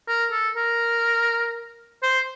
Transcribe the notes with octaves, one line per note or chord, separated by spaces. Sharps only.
A#4
A4
A#4
C5